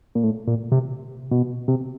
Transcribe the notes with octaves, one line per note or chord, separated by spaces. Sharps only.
A#2
A2
A#2
C3
B2
C3